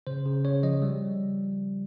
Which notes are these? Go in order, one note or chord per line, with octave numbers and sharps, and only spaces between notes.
C#3 C5
C#3
C#3 C#5
F3 D#5
G3